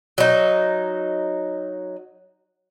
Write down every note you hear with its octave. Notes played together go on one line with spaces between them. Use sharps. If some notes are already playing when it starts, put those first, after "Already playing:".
F#3 D#4